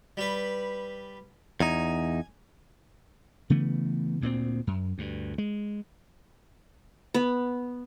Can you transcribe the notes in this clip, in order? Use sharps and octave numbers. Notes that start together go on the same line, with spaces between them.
G3 B4
E2 D#4 G#5
C#3 E3 A3 B3
D2 A#2 G#3 C4
F#2
D2 G2
G#3
B3